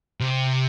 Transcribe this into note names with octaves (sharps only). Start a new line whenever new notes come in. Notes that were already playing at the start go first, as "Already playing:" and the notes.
C3